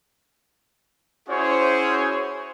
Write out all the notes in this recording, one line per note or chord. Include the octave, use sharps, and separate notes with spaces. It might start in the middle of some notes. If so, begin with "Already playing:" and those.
C#4 E4 F#4 G#4 C5 C#5